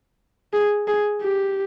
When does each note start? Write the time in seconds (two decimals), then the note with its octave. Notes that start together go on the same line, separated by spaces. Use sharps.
0.53 G#4
0.88 G#4
1.22 G4